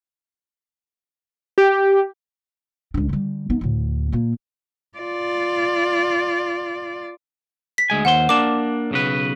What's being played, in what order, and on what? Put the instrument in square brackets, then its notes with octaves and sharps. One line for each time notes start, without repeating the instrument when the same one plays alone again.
[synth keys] G4
[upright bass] C#2 D4
D3 G3
B3 D#4
D2 A2
A#2 A#3
[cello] F4 D5
[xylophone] B6
[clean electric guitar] D2 G#3 G#5
[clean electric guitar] D#2 C5 C6 [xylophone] F#5
[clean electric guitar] A#3 D4 [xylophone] D6 E7
[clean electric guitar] B1 C#3 B4